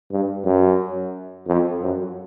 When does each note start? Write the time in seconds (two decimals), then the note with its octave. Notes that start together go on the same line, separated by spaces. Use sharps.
0.11 G2
0.45 F#2
1.47 F2
1.82 F#2